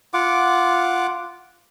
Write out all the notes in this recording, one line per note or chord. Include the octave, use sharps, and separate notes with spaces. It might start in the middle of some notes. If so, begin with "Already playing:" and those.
F4 F#5 D6